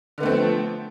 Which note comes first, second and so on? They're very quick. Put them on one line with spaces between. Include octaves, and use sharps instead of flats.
D3 B3 A3 C4 F3